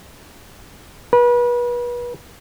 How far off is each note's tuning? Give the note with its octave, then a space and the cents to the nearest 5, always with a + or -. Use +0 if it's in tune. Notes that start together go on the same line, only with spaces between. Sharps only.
B4 -35